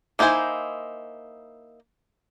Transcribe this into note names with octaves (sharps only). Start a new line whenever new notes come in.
A#3 D#4 E4 C5 G#5